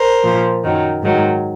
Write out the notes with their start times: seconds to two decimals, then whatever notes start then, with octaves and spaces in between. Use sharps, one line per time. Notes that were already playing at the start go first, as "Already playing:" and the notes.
Already playing: A#4 C5
0.23 A#2 F3
0.63 F#2 D#3 F#3
1.02 G#2 D#3 F#3